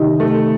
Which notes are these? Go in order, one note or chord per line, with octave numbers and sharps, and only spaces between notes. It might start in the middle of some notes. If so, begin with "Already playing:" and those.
Already playing: C3 D#3 D#4
A3